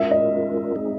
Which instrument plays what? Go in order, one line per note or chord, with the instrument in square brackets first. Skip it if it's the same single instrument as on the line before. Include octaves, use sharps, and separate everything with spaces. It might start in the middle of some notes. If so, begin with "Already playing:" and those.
Already playing: [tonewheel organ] G#3 C#4 F4 A#4 [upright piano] E5
[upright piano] D#5
[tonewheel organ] G#3 C4 D#4 G#4